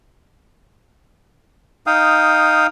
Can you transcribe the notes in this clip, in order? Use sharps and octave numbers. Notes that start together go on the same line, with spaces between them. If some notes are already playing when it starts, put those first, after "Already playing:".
D#4 F5 G5 D#6